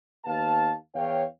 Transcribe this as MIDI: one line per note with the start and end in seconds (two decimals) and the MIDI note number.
0.25 0.73 39
0.25 0.73 58
0.25 0.73 59
0.25 0.73 77
0.25 0.73 81
0.95 1.23 40
0.95 1.23 73
0.95 1.23 77
0.95 1.23 79